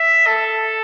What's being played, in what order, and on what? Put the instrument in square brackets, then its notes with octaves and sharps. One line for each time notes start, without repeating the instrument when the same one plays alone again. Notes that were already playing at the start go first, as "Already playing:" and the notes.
Already playing: [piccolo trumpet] E5
A4